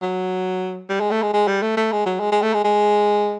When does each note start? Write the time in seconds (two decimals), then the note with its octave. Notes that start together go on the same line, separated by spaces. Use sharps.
0.02 F#3
0.89 G3
1.01 G#3
1.11 A3
1.23 G#3
1.33 G#3
1.48 G3
1.62 A3
1.77 A3
1.92 G#3
2.06 F#3
2.20 G#3
2.32 G#3
2.42 A3
2.54 G#3
2.64 G#3